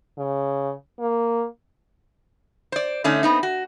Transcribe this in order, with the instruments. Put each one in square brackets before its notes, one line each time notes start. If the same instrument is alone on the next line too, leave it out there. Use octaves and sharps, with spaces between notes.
[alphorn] C#3
A#3
[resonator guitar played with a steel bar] C5 D5
D3 A3 C#4 D#4
B3 C4 D#4
F#4